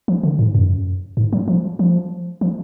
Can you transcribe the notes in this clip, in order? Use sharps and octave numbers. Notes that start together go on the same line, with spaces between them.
F3
D3
G#2
F#2
G#2
F#3
F3
F3
F3